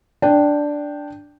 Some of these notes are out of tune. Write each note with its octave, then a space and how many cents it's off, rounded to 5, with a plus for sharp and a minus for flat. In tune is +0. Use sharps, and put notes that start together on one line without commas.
D4 +0 G5 +0